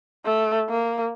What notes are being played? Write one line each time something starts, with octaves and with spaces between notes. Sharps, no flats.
A3
A#3